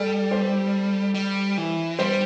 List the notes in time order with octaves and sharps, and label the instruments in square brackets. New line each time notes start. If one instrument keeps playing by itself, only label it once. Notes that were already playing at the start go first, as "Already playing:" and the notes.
Already playing: [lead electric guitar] G3 [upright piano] A4 D5
[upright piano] G4 C5
[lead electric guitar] G3
E3
[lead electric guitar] G3 [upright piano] G4 C5